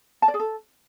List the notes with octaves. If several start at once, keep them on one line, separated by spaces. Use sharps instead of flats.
A5
D5
G#4
A4